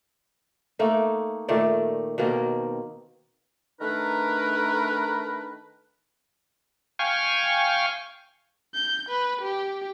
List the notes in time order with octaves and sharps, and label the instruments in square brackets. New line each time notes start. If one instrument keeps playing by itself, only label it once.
[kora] A3 A#3 D#4
A#2 D#3 A3 D5
B2 D#3 A#3 C4
[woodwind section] D#3 A3 D4 D#4 A#4 B4
[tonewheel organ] F5 G5 G#5 C#6
[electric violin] G6
B4
G4